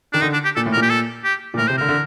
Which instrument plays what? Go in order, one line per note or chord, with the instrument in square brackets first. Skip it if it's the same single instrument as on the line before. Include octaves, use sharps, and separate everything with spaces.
[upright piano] D#3 [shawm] D4
[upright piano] D3 [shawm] D#4
[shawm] D4
G4
[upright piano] A#2 [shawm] A4
[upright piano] A2
[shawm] A#4
[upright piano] A#2
[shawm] G4
A4
G4
[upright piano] A#2
[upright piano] A2 [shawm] A#4
[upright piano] C3 [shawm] C5
[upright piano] D3 [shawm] A#4
[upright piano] D3